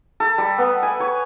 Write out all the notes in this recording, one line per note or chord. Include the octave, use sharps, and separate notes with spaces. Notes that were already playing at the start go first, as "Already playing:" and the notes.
A4
G3
B3
G#5
C#5